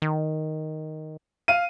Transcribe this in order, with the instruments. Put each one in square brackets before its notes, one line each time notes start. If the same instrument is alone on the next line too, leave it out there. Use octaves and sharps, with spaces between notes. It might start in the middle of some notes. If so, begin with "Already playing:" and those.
[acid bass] D#3
[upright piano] F5 D#7